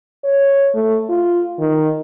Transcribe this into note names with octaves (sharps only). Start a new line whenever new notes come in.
C#5
A3
F4
D#3